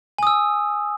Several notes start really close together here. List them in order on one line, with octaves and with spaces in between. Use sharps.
G#5 D#6 E6